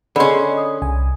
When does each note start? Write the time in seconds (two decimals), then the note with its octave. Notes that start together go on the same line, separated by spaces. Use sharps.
0.16 D3 C#4 G#4 D#5 B5 C6
0.57 D#6
0.82 C2 G#5